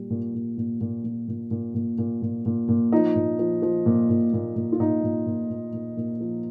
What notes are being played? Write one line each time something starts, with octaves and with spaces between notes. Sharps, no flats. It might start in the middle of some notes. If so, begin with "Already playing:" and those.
Already playing: A#2 G3
A#2
A#2
A#2
A#2
A#2
A#2
A#2
A#2
A#2
A#2
A#2
A#2
F3 D#4
A#2
F3
F3
A#2
A#2
A#2
A#2
F4
A#2 D#4
A#2
A#2
A#2
A#2
A#2
F3